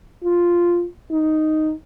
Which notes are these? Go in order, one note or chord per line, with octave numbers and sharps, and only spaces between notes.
F4
D#4